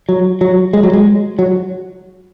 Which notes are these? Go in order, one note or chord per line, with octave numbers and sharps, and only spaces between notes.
F#3
F#3
G#3
F#3
G#3
F#3